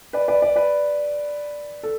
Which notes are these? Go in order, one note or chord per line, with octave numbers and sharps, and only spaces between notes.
B4 D5
B4 D5
B4 D5
B4 D5
A4